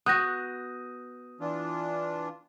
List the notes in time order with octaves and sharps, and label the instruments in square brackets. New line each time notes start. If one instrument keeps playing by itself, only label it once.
[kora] B3 F#4 [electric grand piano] D#6 [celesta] F#6 G6 A#6
[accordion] E3 D4 F4